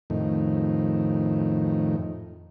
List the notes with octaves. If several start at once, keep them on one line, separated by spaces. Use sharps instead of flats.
F2 A2 D#3